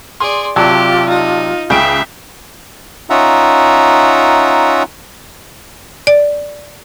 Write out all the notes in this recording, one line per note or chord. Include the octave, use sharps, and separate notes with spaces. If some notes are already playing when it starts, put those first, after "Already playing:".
G#4 D5 C6
C3 F#3 F4 G4 D5 A5
D#4
C#2 C#3 E5 G5 D7
C#4 D#4 F4 E5 F#5 A#5
D5